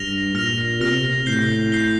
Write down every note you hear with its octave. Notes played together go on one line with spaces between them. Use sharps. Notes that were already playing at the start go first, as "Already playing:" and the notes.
Already playing: G2 F6 A#6 F7
A#2 F6 A#6 F7
C3 F6 A#6 F7
A2 G6 C7 G7
G6 C7 G7